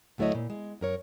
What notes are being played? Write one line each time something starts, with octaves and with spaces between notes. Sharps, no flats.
D2 F#3 A3 E4 C#5 D#5
A#2
G#3
F#2 A#4 C#5